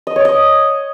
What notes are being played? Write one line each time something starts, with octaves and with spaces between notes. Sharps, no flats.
D#5
C#5
D#5